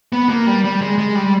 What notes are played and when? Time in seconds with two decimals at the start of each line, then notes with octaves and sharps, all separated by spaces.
0.13 B3
0.29 A#3
0.47 G3
0.64 G3
0.81 G#3
0.98 G#3
1.15 G3